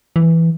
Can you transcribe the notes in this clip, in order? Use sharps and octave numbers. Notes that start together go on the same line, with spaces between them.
E3